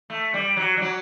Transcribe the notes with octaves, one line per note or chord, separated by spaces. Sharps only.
A3
G3
F#3
G3
F#3